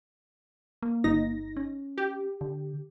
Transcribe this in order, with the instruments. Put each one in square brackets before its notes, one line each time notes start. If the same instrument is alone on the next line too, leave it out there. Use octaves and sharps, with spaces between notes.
[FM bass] A#3
[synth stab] G1 D#4 A#6
[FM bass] C#4
[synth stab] G4
[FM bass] D3